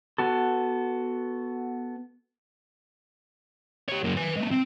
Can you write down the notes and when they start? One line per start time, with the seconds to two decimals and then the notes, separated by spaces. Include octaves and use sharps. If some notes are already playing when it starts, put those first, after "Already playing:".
0.18 B3 F#4 A4
3.89 G4 C#5
4.04 F#2 A#3
4.17 B4 G#5
4.36 G#3 A#3
4.51 C4